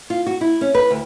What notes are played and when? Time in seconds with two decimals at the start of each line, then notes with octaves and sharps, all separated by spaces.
0.10 F4
0.26 F#4
0.41 E4
0.61 C#4
0.74 B4
0.91 D2